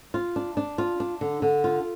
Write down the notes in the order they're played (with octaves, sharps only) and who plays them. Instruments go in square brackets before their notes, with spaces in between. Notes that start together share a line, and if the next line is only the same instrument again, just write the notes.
[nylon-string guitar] F4
D4
D4
F4
D4
D3
D3
F4